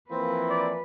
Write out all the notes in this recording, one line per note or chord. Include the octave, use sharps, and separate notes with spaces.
E3 F3 A#3 C4 B4
D5